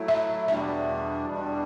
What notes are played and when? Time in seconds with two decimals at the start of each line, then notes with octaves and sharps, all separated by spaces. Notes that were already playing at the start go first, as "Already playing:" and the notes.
Already playing: F#3 A3 E4
0.08 E5
0.48 E2 B2 G3 D4 E5
1.27 E2 B2 G3 D4